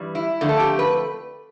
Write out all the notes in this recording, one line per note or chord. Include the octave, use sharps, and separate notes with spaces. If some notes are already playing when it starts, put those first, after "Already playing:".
Already playing: G2 E3 G3
E4
F2 D3 A3
A4
G4
B4